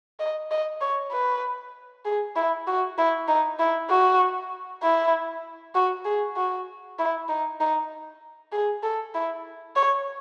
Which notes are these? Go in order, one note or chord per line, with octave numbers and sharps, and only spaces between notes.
D#5
D#5
C#5
B4
G#4
E4
F#4
E4
D#4
E4
F#4
E4
F#4
G#4
F#4
E4
D#4
D#4
G#4
A4
E4
C#5